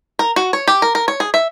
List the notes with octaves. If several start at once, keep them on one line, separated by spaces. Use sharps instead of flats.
A#4
F#4
C#5
G4
A#4
A#4
C#5
G#4
E5